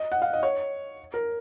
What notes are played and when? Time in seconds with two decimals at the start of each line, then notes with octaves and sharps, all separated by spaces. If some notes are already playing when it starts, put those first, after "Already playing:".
Already playing: D#5
0.12 F#5
0.22 F5
0.33 D#5
0.43 C#5
1.14 A#4